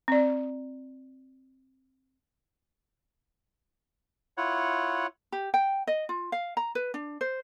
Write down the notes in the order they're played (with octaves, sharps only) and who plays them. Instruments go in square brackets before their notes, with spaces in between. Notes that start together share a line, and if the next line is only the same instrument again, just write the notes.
[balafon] C4 D5
[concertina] E4 F4 C#5 F#5
[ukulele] G4
G5
D#5
F4
F5
A#5
B4
D4
C5